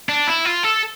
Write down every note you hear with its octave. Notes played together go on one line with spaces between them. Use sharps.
D4
E4
F4
A4